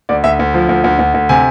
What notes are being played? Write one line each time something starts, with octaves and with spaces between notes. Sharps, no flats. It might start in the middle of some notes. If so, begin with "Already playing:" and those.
D2 D5
D2 E5
D2
F3
D2
D2
D2
D2
C3 G#5